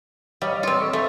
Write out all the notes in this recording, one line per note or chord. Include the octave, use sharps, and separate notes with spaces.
G3 C#5 D#5 F5
C4 F4
A4 B5 C#6
A3 C5 F5